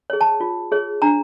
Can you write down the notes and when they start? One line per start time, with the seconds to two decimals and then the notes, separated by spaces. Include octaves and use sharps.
0.10 G#4 C#5
0.21 A5
0.40 F4
0.72 G#4 C#5
1.02 D4 A#5